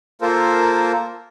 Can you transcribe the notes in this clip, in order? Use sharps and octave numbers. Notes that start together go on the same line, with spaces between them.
A#3 F4 A4 A#4 C5